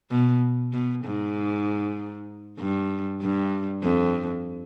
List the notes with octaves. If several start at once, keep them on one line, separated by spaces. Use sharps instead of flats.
B2
B2
G#2
G2
G2
F2